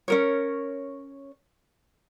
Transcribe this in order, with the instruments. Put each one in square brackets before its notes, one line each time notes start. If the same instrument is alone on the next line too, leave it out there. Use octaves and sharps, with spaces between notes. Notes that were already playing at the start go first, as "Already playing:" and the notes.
[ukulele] C#4 A#4 C#5